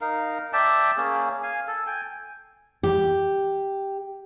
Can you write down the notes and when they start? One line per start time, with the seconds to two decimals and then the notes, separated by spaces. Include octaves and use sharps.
0.01 D#4 A#4 F5
0.53 D5 E5 G5 A5
0.97 A#3 C#4 G#4
1.43 F5 G#5
1.68 A4
1.87 G5 G#5
2.83 G4